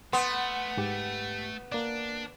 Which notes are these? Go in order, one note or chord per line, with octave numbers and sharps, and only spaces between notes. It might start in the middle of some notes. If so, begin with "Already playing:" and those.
A3 B3 C6
G#2 G4
A#3 D4 D5